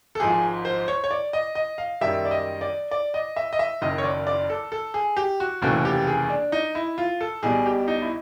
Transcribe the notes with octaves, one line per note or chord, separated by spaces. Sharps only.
A4
G#1 G#2 F3 G#4
C5
C#5
C#5
D5
D#5
D#5
F5
F#2 D#3 G3 E5
D5
D#5
D5
D5
D#5
E5
D#5
E5
F#1 F#2 D#3 D#5
C#5
D5
D5
A4
A4
G#4
G4
F#4
F1 D#2 C#3 E3 A3 F#4
G4
G#4
D4
D#4
E4
F4
A4
B1 B2 G3 G#4
G4
D#4
E4